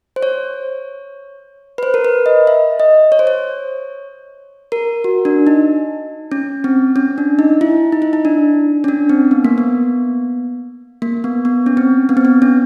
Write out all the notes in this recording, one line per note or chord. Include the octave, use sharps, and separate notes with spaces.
C5
C#5
B4
C5
A#4
B4
D#5
E5
D#5
C#5
C5
C#5
A#4
F#4
D4
D#4
C#4
C4
C#4
D4
D#4
E4
D#4
E4
D#4
D4
C#4
D4
C4
B3
A#3
B3
A#3
B3
B3
C#4
C4
B3
C4
B3
C#4